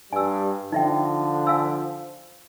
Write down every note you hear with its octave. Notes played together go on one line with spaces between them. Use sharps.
G2 G3 G#5 E6
D3 F3 D#4 E5 G5
F5 G#5 E6